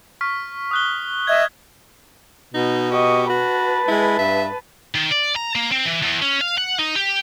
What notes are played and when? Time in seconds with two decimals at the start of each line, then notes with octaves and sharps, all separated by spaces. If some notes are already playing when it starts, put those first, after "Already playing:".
0.21 C#6 F6 B6
0.71 D#6 F#6 G7
1.27 D#5 E5 G#6
2.54 B2 D#4
2.92 G4 D#5 C#6
3.29 F#4 B4 A5
3.88 G#3 E4
4.19 G2 E5
4.95 D#3
5.12 D5
5.36 A#5
5.55 A#3
5.71 C4
5.86 E3
6.02 E2
6.22 C#4
6.41 F5
6.57 F#5
6.79 D#4
6.96 G4